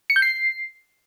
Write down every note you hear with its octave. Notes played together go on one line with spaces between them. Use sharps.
C#7
G6
C7